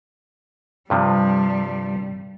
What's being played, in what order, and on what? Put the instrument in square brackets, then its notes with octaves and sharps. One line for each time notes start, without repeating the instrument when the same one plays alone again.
[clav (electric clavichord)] G2 C3 F3 [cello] G3